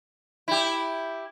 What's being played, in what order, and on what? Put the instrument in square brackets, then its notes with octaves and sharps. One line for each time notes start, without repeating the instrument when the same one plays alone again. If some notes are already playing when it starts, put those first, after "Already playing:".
[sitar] E4 G4